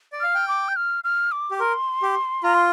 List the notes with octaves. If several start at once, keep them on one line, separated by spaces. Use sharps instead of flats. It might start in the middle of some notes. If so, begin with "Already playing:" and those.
D5
F5 F6
G5
D6
G6
F6
F6
D6
G4
A#4 C6
G4
F4 A#5
C6